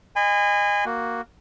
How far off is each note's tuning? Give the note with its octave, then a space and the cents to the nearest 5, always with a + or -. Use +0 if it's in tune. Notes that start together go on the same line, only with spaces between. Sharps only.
D#5 -20 G#5 -25 B5 +35
A#3 +0 F#4 +0